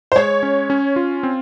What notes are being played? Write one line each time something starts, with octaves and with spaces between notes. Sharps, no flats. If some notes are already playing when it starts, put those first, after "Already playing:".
C5
G#3 C#5
C#4
C#4
F4
C4